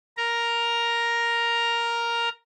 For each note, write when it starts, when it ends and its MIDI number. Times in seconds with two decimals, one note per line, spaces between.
0.17 2.29 70
0.17 2.29 82